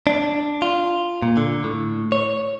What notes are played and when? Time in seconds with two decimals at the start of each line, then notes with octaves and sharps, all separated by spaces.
0.07 D4
0.62 F4
1.22 A#2
1.37 D3
1.64 A2
2.12 C#5